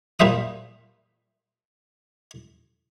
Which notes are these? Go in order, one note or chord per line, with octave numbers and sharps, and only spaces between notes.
A#2 G3 C5 E5 D#6